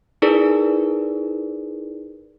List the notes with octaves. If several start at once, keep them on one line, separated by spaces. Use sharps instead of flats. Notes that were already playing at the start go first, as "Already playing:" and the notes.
D#4 E4 G#4 A#4 B4 D5